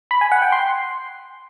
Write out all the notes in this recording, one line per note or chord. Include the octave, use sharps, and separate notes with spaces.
B5
G#5
F#5
G5
C6